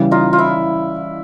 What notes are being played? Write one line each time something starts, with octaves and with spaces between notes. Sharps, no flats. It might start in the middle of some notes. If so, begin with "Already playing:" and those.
Already playing: C#3 E3 G3
D#4 F4
F4
E4